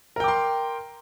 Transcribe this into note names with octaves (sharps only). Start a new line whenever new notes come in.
A#4 G5 C6 D6